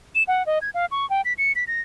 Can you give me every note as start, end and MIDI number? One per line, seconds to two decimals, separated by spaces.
0.15 0.23 100
0.28 0.45 78
0.46 0.59 75
0.62 0.70 92
0.74 0.86 77
0.91 1.08 85
1.10 1.21 79
1.25 1.33 95
1.38 1.52 97
1.56 1.64 95
1.67 1.81 94